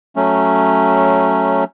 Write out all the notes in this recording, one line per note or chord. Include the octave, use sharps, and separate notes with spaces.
F#3 A3 C#4